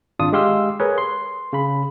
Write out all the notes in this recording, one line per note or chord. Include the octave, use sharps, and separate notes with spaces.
G#1 D4 F4 D#6
G#3 G4 F5 C6 E6
G#4 A#4 B4 C#5
C6
C#3 B5